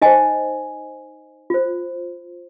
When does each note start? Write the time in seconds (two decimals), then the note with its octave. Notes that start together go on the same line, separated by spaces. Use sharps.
0.02 D#4 C5 D#5 G#5
1.50 F4 C5